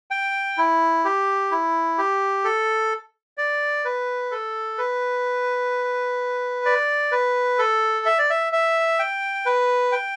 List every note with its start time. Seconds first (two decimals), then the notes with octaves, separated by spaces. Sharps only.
0.11 G5
0.58 E4
1.05 G4
1.51 E4
1.98 G4
2.44 A4
3.38 D5
3.85 B4
4.31 A4
4.78 B4
6.65 D5
7.12 B4
7.59 A4
8.06 E5
8.18 D5
8.30 E5
8.53 E5
8.99 G5
9.46 B4
9.92 G5